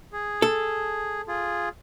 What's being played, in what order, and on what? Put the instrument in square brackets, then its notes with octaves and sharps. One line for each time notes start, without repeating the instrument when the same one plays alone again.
[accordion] G#4
[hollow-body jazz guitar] A4
[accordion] F4 G#4